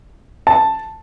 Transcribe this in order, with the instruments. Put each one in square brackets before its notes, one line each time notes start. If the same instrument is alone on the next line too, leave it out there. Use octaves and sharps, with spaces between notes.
[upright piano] A5